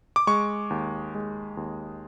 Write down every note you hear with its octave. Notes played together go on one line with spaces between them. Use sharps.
D6
G#3 C#6
D#2
G#3
D#2